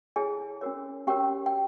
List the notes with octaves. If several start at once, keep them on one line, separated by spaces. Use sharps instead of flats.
E4 G#4 A4 C#5 G#5
C#4 F#4 A#4 C#5
C#4 F#4 G4 A#4 C#5 G5
G5